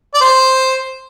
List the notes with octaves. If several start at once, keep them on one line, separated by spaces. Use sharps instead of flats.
D5
C5